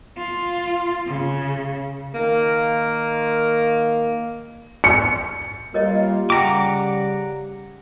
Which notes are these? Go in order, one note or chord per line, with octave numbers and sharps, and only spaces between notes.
F4
C#3
D#3 A#3
C#7
G3 A#3 F4 A#4 C#5 D#5
C#3 G3 F#5 G5 A#5 D6